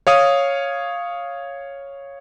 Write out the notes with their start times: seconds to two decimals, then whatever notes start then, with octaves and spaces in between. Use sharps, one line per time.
0.07 C#5 F5 D#6